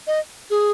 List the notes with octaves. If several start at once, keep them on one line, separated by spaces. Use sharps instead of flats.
D#5
G#4